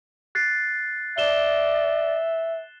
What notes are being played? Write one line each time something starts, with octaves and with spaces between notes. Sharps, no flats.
F#6 A6 C7
D5 E5 E7 G7